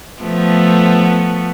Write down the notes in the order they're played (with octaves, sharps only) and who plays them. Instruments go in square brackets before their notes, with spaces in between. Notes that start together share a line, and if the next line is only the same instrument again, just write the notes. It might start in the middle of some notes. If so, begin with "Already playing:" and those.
[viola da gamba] F3 A3 B3